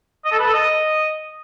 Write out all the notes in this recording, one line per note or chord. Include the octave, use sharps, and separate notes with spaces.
D#5
A4
B4
A4
D#5